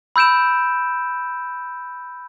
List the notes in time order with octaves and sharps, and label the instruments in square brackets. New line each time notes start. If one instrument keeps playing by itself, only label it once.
[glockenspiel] B5 E6 G6 D7 E7